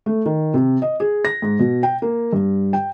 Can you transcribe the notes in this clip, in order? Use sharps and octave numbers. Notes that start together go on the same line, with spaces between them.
A3
D#3
C3
D#5
G#4
A#6
G#2
B2
G5
A#3
G2
G5